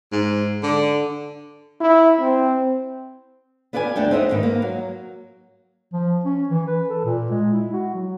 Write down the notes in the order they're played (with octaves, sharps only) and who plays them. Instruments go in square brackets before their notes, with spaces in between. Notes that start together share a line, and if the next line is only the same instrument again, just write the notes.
[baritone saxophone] G#2
D3
[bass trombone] E4
C4
[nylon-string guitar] B3 F4 B4 D5 E5 G#5
D2 A3 D4 A4 G5
C4 D#4 E5 F#5
G#2 D#3 B3
A#3
F#3
[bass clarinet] F3
C#4
E3
B4
A4
A#2
G#3
E4
F#4
F#3